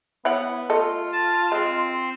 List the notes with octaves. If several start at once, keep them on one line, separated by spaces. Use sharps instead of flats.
B3 E4 C#5 F#5
A3 F4 A4 D#5
A5
G#3 C4